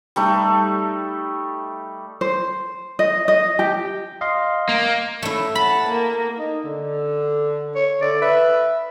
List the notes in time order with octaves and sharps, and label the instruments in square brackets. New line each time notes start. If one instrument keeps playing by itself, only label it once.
[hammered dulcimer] G3 A3 D#4
[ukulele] C5
D#5
D#5
G4
[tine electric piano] D#5 F5 C6
[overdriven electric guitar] A#3
[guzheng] A3 E4
[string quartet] F#5 A5 [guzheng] B5
[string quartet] A#3
[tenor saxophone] D#4
D3
[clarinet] C#5
[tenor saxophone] D3 [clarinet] D5
[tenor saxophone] B4 [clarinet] E5